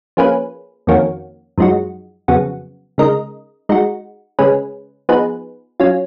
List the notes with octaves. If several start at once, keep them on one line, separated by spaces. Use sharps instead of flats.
F3 A#3 C#4 G#4 B4
F2 D#3 A#3 C#4 F#4
F#2 F3 G#3 D#4 F#4
F2 C#3 F#3 B3 F#4
C#3 G#3 D#4 A#4 D#5
G#3 D#4 F#4
C#3 G#3 C#4 G#4 B4
F3 B3 D#4 G#4 B4
F#3 C#4 F4